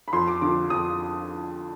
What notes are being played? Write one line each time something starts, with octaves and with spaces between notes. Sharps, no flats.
B5
F2 C6
D6
D3 F3 D6
F2 D#6